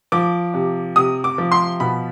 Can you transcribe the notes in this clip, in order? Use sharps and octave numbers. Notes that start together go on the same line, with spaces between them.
F3 D6
C3
C3 D#6
D6
F3
C6
B2 B5